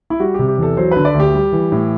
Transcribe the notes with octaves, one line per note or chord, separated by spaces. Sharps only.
E4
G3 F#4
C3 G4
G4
E2 A4
F#3 C5
D3 B4
D5
D2
G4
G3
E3
A2